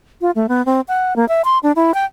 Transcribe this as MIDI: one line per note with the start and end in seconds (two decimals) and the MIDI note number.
0.21 0.31 65
0.35 0.47 57
0.49 0.64 59
0.66 0.81 60
0.88 1.16 78
1.16 1.28 58
1.28 1.42 76
1.45 1.58 84
1.63 1.72 62
1.76 1.94 64
1.94 2.05 79